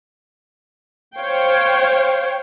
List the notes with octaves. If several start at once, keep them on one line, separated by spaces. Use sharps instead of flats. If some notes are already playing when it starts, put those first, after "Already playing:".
C5 C#5 F5 G5